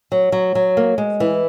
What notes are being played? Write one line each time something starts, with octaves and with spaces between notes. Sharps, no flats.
F#3
F#3
F#3
A#3
G#3
E3